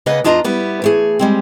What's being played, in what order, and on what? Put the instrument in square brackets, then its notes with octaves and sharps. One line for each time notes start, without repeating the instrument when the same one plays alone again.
[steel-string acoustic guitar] C#3 A#3 B4 D#5 F#5
E2 D4 F4 D#5 A5 A#5
G3 B3 E4
E3 A3 G#4
G3 G#3 C4